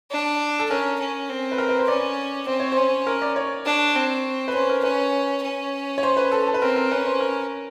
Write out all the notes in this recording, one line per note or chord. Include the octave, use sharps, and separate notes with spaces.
D4
A4
C#4 A#4
C#4
C4
B4
A#4
B4
C5
C#4 D5
C4 C5
C#5
C#4 C5
A#4
D5
C#5
D4
C4
B4
C#4 C5
A#4
C#4 B4
C#4
C#5
C5
B4
A4
A4
B4
C4 A#4
A#4
C#4 B4
C5
A#4